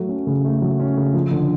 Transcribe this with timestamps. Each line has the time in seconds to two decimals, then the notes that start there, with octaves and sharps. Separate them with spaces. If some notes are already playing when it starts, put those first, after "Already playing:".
Already playing: F#3 A3
0.09 C#4
0.27 C#3
0.45 A3
0.62 F#3
0.80 C#4
0.97 C#3
1.14 F3
1.31 D3